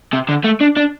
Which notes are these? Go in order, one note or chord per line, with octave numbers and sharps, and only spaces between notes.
C3
D3
A3
D4
D4